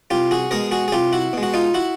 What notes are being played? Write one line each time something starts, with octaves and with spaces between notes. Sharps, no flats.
C2 F4 G4
F#4 G#4
B2 G#3 G#4 A#4
F#4 G#4
G#4
C2 F4 G4
E4 F#4
B2 G#3
F#4
D#4 F4
E4 F#4